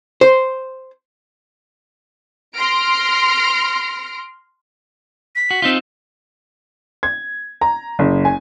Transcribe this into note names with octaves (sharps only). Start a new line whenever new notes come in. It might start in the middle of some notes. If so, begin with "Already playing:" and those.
C5
C6 F6 A#6 D7
B6
F#4
C4 D#4 F4
G#6
A#5
F#1
G#5